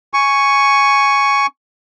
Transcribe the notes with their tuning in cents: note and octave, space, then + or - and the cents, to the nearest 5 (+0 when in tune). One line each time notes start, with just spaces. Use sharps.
G#5 +0 C#6 +5